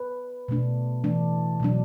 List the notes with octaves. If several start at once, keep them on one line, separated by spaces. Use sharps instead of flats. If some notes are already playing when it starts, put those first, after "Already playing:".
Already playing: B4
B2 A3 D4
E3 A3 D4
B2 F#3 D4